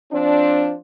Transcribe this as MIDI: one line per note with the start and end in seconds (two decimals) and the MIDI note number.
0.13 0.74 53
0.13 0.74 60
0.13 0.74 62